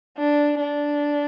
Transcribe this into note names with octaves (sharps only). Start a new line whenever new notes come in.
D4
D4